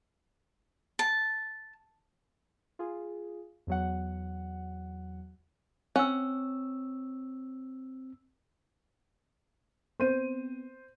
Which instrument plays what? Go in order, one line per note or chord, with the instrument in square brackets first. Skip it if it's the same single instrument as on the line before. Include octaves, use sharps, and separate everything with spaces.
[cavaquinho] A5
[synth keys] F4 G#4
E2 F#3 F#5
[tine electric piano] C4 E6 [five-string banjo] C#4 F#5
[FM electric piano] B3 C4 [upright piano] C5 D#7